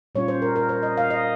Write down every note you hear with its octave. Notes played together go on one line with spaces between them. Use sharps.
A#2 G3 C#4 F4 C#5
C5
A#4
A#4
C5
D#5
F5
D#5